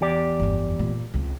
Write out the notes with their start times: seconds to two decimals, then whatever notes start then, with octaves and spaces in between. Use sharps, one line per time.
0.01 E2 G4 D5
0.40 G1 F2
0.79 A#2
1.14 C#2 C4